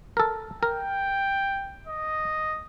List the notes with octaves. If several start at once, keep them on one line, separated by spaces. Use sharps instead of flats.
A4 A#4
A#4 G5
D#5